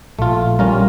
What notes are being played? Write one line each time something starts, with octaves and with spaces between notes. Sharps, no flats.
A#1 A#2 A3 F4
G3 C#4 F4 A#4